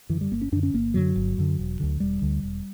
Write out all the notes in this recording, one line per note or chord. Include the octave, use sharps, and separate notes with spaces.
F#2 D3 E3
G3
G1 A#3
C#4
F#2 D3 D4
C#4
G1 A#3
F#2 D3 F#3
G1
F#2 D3
E1
D2 D3
E1 G3
D2 D3
E1